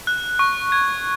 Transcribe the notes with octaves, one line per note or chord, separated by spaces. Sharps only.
F#6
C#6
G#6